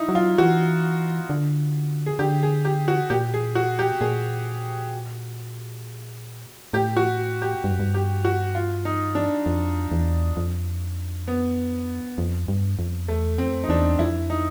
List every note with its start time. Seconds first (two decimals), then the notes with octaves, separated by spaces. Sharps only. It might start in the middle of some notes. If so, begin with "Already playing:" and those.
Already playing: D#4 E4
0.09 F#3
0.15 F4
0.38 E3 F#4
1.30 D3
2.06 G#4
2.19 D3 G4
2.43 G#4
2.65 G4
2.88 F#4
3.10 A#2 G4
3.34 G#4
3.55 F#4
3.79 G4
4.01 A#2 G#4
6.73 A2 G4
6.97 F#4
7.42 G4
7.64 G2
7.71 F#2
7.80 G2
7.94 G4
8.25 F#4
8.55 F4
8.85 D#4
9.15 D4
9.46 F2
9.91 E2
10.37 F2
11.28 B3
12.18 F2
12.48 G2
12.79 F2
13.08 E2 A3
13.38 F2 C4
13.64 D#4
13.69 E2 D4
13.99 F2 E4
14.30 D#4